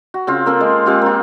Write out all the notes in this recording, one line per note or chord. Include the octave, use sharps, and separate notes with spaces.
F#4
C#3 C4 F4
A#3 C4 A4
G#3
G#3 C4 F4 G4
A#3 F4